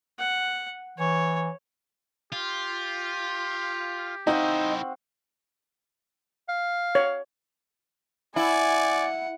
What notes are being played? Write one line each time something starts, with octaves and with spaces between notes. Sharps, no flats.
F#5
E3 C#5
F4 G4
C4 D#4 E4 F#4 C5 F5
F5
C#5
E4 D5 F#5 G#5